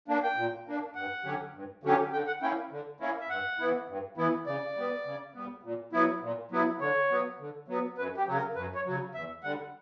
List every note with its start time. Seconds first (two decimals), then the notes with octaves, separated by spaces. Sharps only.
0.08 A#3 D4
0.23 G5
0.37 A#2
0.67 A#3 D4
0.95 G2 F#5
1.24 D3 F#3 C#4 G4
1.54 G2
1.84 D3 F#3 C#4 G4
2.12 D3 G5
2.27 F#5
2.41 A#3 C#4 E4 G5
2.71 D3
3.00 A#3 C#4 E4
3.20 E5
3.29 G2 F#5
3.59 E3 B3 E4
3.88 G2
4.17 E3 B3 E4
4.46 C#3 D5
4.76 G3 B3
5.05 C#3
5.35 G3 B3
5.63 A#2
5.92 F#3 B3 E4
6.22 A#2
6.51 F#3 B3 E4
6.80 D3 C#5
7.10 F#3 B3
7.39 D3
7.68 F#3 B3
7.98 F#2 B4
8.17 G4
8.27 C#3 F#3
8.37 A#4
8.56 F#2 B4
8.75 C#5
8.85 C#3 F#3
9.14 E2 E5
9.43 D3 G3 F#5